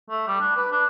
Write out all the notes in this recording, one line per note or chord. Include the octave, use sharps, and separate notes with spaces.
A3
G3
D4
B4
D4